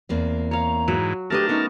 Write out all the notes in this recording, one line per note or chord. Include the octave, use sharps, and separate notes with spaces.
E2 A#3 C4
C#5 F5 A#5
G#2 E3 F#3
A3 D4 G4 G#4 A#4 B4 D#5 A5
B3 C#4 D#4